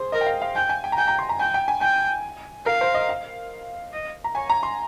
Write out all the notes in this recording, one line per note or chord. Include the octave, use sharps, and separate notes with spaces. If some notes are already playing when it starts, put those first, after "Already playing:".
Already playing: G#4 C5
A#4 D#5
G5
F5
F5
G5 G#5
G#5
G5
A#5
G5 G#5
A#5
C6
A#5
G5 G#5
G5
G#5
G5 G#5
A#4 F5
C5
D#5
F5
D#5
A#5
C#5 G#5
A#5
C6